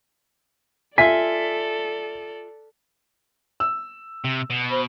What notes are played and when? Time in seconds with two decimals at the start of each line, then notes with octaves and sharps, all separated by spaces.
0.98 F4 A4 D5 E5 G#5 B6
3.60 E6
4.24 C3
4.50 B2
4.70 C5 B5